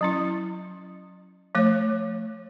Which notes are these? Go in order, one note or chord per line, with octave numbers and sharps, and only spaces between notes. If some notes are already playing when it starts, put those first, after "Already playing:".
F#3 C#4 E4
F3 A3 C#5